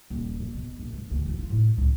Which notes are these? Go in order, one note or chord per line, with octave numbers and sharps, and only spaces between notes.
D#1
F2
B2
A#1
G#2
D2
E3
F4
A2
C#2